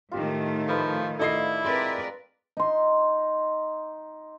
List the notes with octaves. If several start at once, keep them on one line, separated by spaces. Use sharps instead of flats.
A2 D#3 A3 F4 G4
F3 A4 B4 D#5
D4 E4 F4 A4 D#5 F5 C7
G#3 C4 A#4 B4 D5
D#4 C6